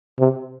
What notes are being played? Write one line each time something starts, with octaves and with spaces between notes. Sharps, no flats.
C3